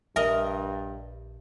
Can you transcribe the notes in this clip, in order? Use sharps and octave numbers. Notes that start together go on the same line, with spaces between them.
A#1 G2 A#4 D#5 E5